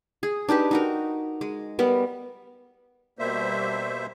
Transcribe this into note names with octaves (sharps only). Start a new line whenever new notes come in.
G#4
D4 D#4 G4 B4
D#4 F#4 A#4
G#3
G3 B3 A#4
B2 G3 A#3 C5 E5